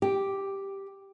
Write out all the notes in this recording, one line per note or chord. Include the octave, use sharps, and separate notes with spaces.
G4